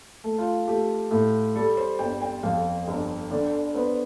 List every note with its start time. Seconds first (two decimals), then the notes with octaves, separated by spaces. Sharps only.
0.24 A3
0.38 F4
0.67 A3 G4
1.11 A2
1.55 G3 A4
1.77 C5
1.99 G1 G5
2.21 G5
2.43 F2 F5
2.88 G1
3.31 D3 D5
3.74 B3 C5